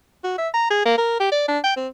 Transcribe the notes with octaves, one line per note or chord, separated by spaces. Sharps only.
F#4
E5
A#5
G#4
A#3
A#4
G4
D5
D4
G5
C4